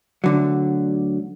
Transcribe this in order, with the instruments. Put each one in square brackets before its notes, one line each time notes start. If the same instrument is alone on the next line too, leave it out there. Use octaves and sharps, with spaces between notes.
[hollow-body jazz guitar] D2 D3 F#3